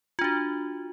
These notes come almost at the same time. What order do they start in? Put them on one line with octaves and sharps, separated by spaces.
F4 D4 F#4